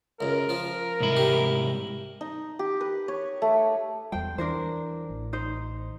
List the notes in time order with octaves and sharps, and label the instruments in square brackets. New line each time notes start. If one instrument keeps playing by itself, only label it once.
[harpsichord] C#2 F#2 [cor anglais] A#4
[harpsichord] F3 F4
[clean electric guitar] C2 G#2 E4
[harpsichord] G4
[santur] D#4
G4
B4
C#5
A3
[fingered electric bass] E2 G3 [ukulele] C5 G5
[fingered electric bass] E3 [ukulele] D4 A#4 C5
[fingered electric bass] A1
[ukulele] D#4 C5